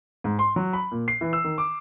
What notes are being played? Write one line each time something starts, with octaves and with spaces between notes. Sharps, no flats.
G#2
C6
F#3
B5
A#2
C7
E3
E6
D#3
D6